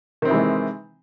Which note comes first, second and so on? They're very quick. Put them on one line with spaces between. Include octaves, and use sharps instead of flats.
D#3 C4 C3 E3 G#3